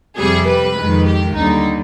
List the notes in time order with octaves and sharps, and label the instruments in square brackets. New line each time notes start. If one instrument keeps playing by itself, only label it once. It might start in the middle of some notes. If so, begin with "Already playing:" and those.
[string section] F2 C3 G3 G#4
B4
F2 D#3 G#3
G4
D#2 D3 G3 D#4